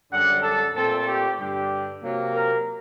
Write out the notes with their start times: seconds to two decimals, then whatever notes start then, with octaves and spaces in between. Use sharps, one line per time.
0.10 F#2 D3 G3 D4 F#5
0.41 A4
0.73 A#2 A3 C4 A4
1.05 G4
1.37 G2 D3 G3 D4 G4
2.01 C3 F#3 A#3
2.33 A#4